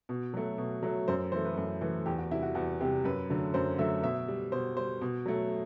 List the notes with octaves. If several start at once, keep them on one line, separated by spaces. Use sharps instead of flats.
B2
F#3 A3
B2
F#3 A3
F#2 C5
E3 A3 C5
B4
F#2
E3 A3
E2 G4
F#4
C3 G3 E4
F#4
E2 F#4
C3 G3 G4
F#2 B4
D3 F#3 A3
F#2 C5
D3 F#3 A3 E5
B2 E5
G3
B2 C5
G3 C5
B2
F#3 A3